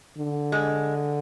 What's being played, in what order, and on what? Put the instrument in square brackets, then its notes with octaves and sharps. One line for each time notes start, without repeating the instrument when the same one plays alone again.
[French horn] D3
[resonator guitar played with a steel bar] G#3